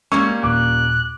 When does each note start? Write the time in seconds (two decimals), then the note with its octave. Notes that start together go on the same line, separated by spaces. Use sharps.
0.12 G3 G#3 A#3 C#4 C#6 E6
0.43 D#2 A#2 D6 F#6